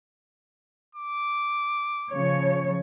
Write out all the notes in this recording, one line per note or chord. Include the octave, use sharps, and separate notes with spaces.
D6
C#3 F3 C#5